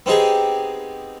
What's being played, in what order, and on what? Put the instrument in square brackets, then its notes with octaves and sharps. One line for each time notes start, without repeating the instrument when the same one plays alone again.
[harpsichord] B3 C4 D#4 G4 G#4